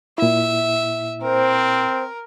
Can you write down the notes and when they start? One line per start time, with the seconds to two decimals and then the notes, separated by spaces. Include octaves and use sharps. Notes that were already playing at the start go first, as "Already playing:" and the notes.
0.18 A#2 E4 E5
1.22 C4 A#4 C5